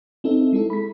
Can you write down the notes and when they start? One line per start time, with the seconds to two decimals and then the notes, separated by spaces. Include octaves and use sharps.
0.24 C4 D#4 A4 E5
0.53 G#3 E4 A4
0.70 B5 B6